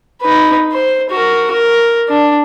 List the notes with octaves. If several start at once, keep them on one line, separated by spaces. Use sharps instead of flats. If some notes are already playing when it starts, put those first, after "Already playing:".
D#4 B4
C5
F#4 A#4
A#4
D4